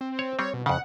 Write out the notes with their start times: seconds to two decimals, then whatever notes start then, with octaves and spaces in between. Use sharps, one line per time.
0.01 C4
0.19 C#5
0.39 G3 C4 C#5
0.54 B2
0.66 F2 C#3 F#5